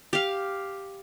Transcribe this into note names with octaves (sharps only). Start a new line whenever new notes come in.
G4 F5